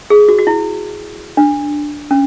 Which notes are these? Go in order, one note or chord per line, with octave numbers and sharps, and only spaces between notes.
G#4
F#4
F#4
E4
D4
C#4